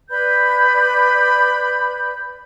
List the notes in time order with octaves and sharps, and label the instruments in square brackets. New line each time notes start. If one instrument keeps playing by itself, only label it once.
[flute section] B4 D5 B5 G6